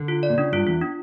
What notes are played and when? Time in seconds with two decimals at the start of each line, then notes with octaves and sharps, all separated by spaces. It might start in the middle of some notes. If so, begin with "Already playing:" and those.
Already playing: D3
0.08 F4
0.23 D5
0.30 A#2
0.37 C#3 D4
0.52 G2 F4
0.67 E2 F4
0.81 D4